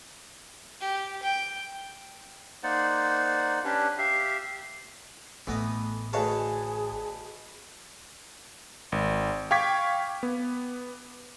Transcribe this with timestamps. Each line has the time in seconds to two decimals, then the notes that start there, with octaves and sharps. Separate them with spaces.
0.81 G4
1.23 G5
2.63 A#3 D#4 C5 D5 F#5
3.64 C#4 D4 G4 B4
3.98 G4 E5 F5
5.47 A1 E3 A3 B3 D#5
6.13 D2 G#4 B4 C#5 D#5 F5 A5
8.92 G#1
9.51 F5 G5 C#6 D6 G#6 B6
10.23 B3